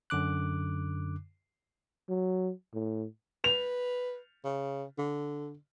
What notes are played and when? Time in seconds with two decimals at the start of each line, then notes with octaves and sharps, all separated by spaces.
0.10 F#2 D3 D6 F#6
2.09 F#3
2.74 A2
3.44 B4 F7
4.44 C#3
4.98 D3